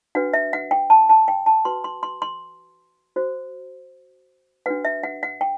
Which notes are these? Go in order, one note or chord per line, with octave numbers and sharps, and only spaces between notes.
D4 F#4 B4 F#5
E5
F#5
G5
A5
A5
G5
A5
F#4 B4 C6
C6
C6
C6
F#4 C5
D4 F#4 B4 F#5
E5
F#5
F#5
G5